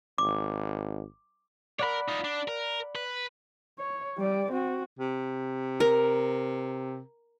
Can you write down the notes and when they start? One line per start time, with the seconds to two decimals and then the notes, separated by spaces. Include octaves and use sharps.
0.18 G#1 D6
1.79 A#4 C#5 D5 F#5 B5
2.08 D#4 F4
2.24 D4
2.48 A#4
2.95 B4
3.79 C#5
4.18 G3 D5
4.52 C4 F#4
4.99 C3
5.80 A#4